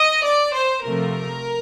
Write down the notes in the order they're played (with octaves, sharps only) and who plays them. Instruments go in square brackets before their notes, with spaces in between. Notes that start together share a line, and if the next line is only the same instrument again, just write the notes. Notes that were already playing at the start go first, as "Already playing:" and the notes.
Already playing: [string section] D#5
D5
C5
C3 F3 A3 A#4